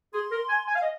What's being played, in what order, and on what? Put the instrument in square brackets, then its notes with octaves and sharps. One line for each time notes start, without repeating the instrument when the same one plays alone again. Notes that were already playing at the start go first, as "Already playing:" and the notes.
[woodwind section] G#4 [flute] C6
[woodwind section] A#4
G#5
G#5
F5
D#5